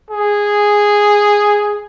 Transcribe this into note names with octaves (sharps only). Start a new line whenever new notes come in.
G#4